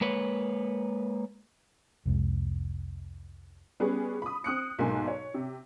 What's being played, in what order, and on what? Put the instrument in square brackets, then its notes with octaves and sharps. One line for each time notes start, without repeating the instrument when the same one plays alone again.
[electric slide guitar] G#3 A#3 B4 C#5
[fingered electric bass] C2 F2 C3 G#3
[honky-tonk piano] G3 B3 C#4 G#4 B4
B5 D#6
C4 D#6 F#6 C#7
B1 G#2 A#3 G#5 C6
C#5
C3